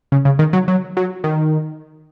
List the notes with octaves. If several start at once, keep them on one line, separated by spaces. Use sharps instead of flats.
C#3
C#3
D#3
F#3
F#3
F#3
D#3